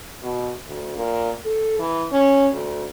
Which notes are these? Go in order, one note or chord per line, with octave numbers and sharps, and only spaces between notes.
B2
D2
A#2
A4
E3
C#4
D2